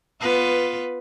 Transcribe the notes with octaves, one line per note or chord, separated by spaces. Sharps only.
B3 F4 B4